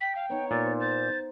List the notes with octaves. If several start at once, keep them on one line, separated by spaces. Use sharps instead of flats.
G5 B6
F5
B3 D#4 C#5
A#2 A6
C5
G6 A6